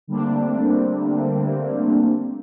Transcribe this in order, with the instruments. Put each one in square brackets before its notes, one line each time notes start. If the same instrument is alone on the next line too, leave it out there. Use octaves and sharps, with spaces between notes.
[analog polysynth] D3 G3 A3 A#3 C4 D4